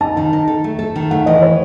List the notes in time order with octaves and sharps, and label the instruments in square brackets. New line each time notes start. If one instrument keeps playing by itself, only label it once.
[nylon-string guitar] D#4 [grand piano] A5
[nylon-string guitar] D#3 [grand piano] A5
[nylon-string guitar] D#4
A4
A3
A4
D#3
[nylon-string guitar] A3 [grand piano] F#5
[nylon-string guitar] E3 [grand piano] D#5
[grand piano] C#5